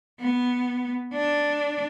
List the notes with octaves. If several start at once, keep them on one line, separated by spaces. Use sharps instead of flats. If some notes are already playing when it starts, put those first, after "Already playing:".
B3
D4